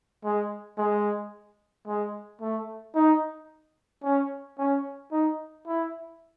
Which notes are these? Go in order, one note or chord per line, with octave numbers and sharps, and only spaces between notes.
G#3
G#3
G#3
A3
D#4
C#4
C#4
D#4
E4